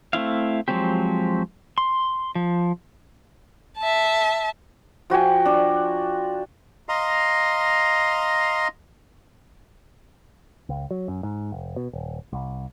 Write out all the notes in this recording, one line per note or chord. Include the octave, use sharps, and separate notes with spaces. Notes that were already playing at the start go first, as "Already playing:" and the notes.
A3 C4 E4 F5
F3 F#3 G#3 C4 G4
C6
F3
E5 A5
F3 F#4 G5 G#5
D4
D#5 F5 A#5 C6
C#2
F#3
F#2
G#2
F1
B2
D#1
C2